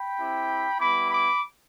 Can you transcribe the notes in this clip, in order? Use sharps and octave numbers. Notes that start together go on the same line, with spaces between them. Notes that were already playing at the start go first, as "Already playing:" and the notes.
Already playing: G5 B5
C4 E4 G4
G3 B3 E4 B5 D6
B5 D6